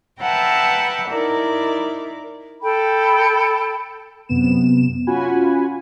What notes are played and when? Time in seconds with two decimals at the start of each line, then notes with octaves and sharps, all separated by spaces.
0.21 B4 E5 F#5 G5 A5 A#5
1.07 D#4 E4 A#4 D5
2.62 A4 G5 B5
4.29 F#2 C3 B3 E7
5.07 C#4 F4 F#4 F#5 G#5 B5